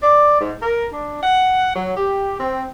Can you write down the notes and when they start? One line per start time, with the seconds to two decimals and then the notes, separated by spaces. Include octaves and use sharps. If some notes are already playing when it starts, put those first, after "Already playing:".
0.02 D5
0.41 G#2
0.62 A#4
0.92 D4
1.23 F#5
1.76 F#3
1.96 G4
2.40 C4